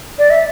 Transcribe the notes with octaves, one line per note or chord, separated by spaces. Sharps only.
D5
E5